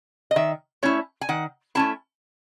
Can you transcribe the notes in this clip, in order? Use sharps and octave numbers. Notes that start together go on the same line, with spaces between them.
D#5
D#3 E5
A3 C#4 E4 C#5
G#5
D#3 F#5
A3 C#4 E4 A5